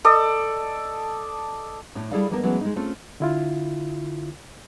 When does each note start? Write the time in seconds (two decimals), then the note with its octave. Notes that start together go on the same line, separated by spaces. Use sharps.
0.05 A4 D5 D#5
1.95 A2 D4 C#5
2.12 G3 E4 G#4 A4 D5 F5
2.30 E3 F3 A#3 B3 D4 A#4
2.43 E3 F#3 G#3 A3 B3 C#4
2.61 G#3 D#4
2.76 A3 C4 C#4 F4
3.20 D3 E4 F4